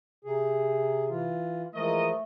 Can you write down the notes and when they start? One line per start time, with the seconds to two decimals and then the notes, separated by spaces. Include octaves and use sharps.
0.24 C3 G#4
1.09 E3 F4
1.75 E3 F3 G#3 A3 A#4 D#5